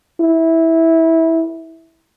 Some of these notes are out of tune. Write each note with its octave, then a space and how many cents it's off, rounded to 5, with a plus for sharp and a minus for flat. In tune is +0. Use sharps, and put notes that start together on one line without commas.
E4 -15